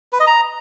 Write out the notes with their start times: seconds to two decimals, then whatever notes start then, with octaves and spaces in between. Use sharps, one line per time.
0.13 B4
0.20 D#5
0.27 A#5